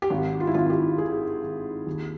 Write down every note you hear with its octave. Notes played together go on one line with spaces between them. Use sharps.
G4
G#1 F#4
F4
E4
G#1 F4
G4
D#3 G#4
D#3
D#2